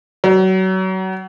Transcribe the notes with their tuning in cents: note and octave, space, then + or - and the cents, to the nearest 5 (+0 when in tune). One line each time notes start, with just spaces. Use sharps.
F#3 +30